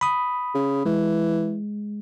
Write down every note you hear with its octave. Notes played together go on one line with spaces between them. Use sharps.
B5 D#6
C#3
E3 G#3